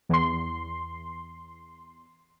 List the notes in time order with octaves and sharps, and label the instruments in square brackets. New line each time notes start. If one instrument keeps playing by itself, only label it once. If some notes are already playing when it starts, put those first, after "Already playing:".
[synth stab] E2 C6